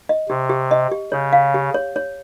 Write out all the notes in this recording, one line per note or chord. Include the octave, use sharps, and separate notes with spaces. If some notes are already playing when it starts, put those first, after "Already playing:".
D#5
C3 G4
G4
D#5
G4
C#3 C#5
F5
G4
C#5
C#5